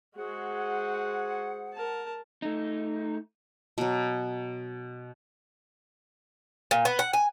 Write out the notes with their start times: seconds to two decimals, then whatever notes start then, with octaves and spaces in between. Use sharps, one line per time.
0.16 G#3 F#4 G#4 C5 F#5
1.73 A#4 A5
2.42 A3 D#4
3.78 B2 F#3
6.71 A#2
6.85 B3
6.99 F#5
7.13 G#5